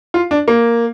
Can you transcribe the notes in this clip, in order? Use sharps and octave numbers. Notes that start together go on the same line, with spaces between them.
F4
D4
A#3